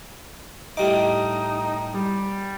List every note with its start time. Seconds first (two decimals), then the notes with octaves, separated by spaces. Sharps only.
0.77 A2 G3 D#4 D6
1.94 G3